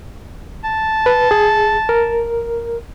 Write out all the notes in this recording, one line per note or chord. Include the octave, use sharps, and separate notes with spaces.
A5
B4
G#4
A#4